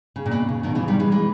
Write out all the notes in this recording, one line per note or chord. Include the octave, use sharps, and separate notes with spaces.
C#3
A#2
B2
C#3
B2 D#3
C#3 E3
D#3 G3
E3 G#3
E3 G#3